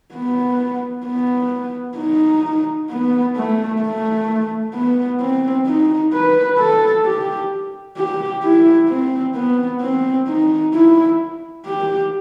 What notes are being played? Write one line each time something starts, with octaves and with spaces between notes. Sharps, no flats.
B3
B3
D#4
B3
A3
A3
B3
C4
D#4
B4
A4
G4
G4
E4
C4
B3
C4
D#4
E4
G4